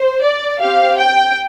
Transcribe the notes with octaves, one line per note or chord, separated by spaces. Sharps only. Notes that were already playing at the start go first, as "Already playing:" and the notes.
Already playing: C5
D5
C4 G4 F5
G5